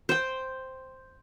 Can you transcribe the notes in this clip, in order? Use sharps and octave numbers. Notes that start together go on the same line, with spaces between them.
C5 G5